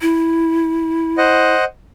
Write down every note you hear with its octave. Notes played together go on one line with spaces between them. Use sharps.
E4
C5 D#5 F#5